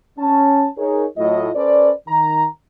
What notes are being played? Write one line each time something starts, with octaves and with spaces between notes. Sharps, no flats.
C#4 A5
D#4 G#4 A#4 C#5
A2 F#3 A3 E4 F4 D#5
C#4 A4 B4 C5 D5
D#3 A#5